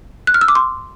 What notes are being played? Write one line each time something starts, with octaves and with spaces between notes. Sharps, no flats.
F#6
F6
E6
D6
C6